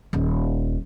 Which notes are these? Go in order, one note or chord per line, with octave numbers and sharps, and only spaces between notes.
D#1